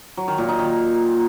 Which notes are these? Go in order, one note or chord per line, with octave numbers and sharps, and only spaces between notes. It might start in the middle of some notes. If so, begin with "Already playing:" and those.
F#3
D#3
A#2
D#4
D#3